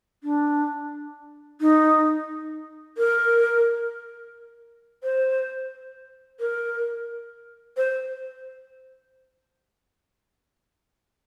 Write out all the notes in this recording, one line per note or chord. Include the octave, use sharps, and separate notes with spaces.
D4
D#4
A#4
C5
A#4
C5